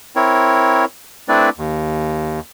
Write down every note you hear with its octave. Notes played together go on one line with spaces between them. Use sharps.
C4 E4 A#4 C#5
A3 C4 D4 E4 B4 D5
D#2